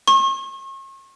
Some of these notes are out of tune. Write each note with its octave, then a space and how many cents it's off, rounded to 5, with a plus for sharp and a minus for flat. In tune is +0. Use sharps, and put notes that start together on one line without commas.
C#6 -40